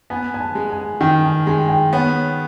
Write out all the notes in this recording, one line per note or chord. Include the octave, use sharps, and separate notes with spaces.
B3 G#5
G#5
A5
G#3
G#5
D#3 G5
G#5
G#3 G#5
G5
B3 C#5